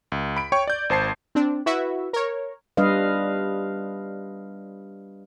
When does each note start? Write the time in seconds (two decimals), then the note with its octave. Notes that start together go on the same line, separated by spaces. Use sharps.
0.12 C#2
0.36 B5 D7
0.52 C#5 G5 C#6
0.67 D5 G6
0.90 G#1 C5 A5 C7
1.35 C4 D4
1.66 E4 F#4 B4 E5
2.13 A#4 C#5
2.77 G3 D4 B4 D#5 F5